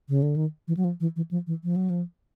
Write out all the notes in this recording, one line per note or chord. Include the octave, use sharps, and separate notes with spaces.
C#3
D3
D#3
E3
F#3
F3
E3
E3
F3
E3
F3
F#3
F3